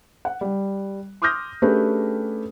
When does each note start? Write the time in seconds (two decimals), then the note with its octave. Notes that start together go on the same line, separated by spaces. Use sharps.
0.25 F#5
0.41 G3
1.22 C6 D6 D#6 F6 G6 A#6
1.62 A3 C#4 D4 G4 G#4 B4